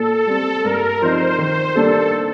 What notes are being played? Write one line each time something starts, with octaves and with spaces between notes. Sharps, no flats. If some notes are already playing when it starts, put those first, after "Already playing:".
Already playing: A#2 A4
G3 C4
G2 A#4
F3 C4 D#4 C5
D#3 C5
G3 A#3 D4 A4